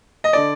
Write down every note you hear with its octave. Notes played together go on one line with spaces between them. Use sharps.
D#5
D3 D5